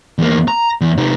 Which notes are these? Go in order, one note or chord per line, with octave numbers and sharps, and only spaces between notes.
E2 A#3
A#5
E2
C3 D#4